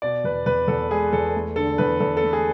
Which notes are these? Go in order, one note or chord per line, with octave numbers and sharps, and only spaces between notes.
B2 D5
E2 B4
E2 B4
E2 A4
G#3 G#4
E2 A4
A3
D3 A4
E2 B4
E2 A4
A4
A3
G#4